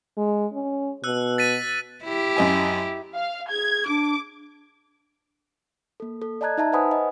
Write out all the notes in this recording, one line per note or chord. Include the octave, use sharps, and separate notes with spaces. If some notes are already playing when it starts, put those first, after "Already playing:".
G#3
C#4
B2 E6 F#6
A6 B6 D#7
E4 G4
F#2 D#5 G#5
F5
G#4 G#6
D4 D6
A#3 A4
A4
D5 D#5 A5 A#5 F#6 G#6
D#4 E5 A5 A#5
B4 C5 F#5 G#5 B5 D#6
D#5